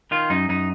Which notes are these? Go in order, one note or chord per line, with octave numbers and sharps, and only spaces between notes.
D#3 F4
F#2 D#4
F#2 D#4